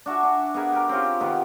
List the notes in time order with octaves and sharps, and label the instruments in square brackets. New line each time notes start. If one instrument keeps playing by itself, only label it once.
[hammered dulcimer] D4 F#4 E5 G#5
D4
B3 G#4 A#4 G#5
G4 A#4
C4 C#4 F4 G4
C3 D#3 B3